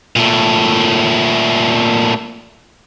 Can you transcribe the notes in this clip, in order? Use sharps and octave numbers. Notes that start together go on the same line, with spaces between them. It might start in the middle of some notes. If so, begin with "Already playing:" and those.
A#2 A3